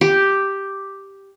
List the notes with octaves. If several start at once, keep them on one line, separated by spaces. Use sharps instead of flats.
G4